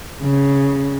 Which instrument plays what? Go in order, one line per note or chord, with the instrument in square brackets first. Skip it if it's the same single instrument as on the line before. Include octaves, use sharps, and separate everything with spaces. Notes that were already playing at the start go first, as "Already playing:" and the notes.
[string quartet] C#3